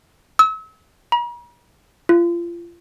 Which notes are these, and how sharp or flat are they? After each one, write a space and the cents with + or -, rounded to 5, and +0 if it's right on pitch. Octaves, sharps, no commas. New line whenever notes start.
E6 -40
A#5 +45
F4 -30